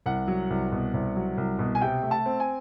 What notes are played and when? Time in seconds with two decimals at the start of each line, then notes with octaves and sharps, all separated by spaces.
0.06 C2 F#5
0.28 F#3
0.50 C2
0.72 B2
0.94 C2
1.16 F#3
1.37 C2
1.59 B2
1.75 G#5
1.81 C3 G5
2.03 A3
2.11 A5
2.26 C4
2.40 G#5